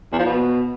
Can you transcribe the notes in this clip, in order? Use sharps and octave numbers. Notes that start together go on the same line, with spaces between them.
E2
F3
B2